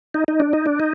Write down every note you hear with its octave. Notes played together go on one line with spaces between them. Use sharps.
D#4
D#4
D4
D#4
D4
D#4